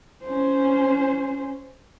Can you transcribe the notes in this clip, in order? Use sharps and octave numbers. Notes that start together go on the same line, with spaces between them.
C#4 C5